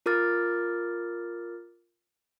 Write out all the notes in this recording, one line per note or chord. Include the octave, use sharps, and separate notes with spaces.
F4 A#4 D6 F6 A6